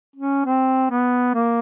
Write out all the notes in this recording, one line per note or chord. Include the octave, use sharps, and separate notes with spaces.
C#4
C4
B3
A#3